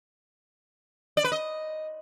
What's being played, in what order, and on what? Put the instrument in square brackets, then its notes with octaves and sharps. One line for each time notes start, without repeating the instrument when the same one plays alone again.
[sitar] D5
B4
D#5